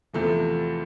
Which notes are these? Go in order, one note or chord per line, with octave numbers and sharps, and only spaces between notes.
E2 C3 F3 A3